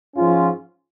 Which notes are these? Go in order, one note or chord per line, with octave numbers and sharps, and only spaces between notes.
G#2 F3 C#4 F4